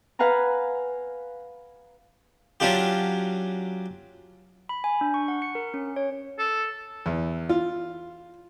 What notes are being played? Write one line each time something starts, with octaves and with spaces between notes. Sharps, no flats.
B4 F5 F#5 G#5 A#5
F#3 C#4 D4 F4 G4
B5
G#5
D4
C#6
F#5
C#7
A#4
C#4
C#5
A4
E2
F4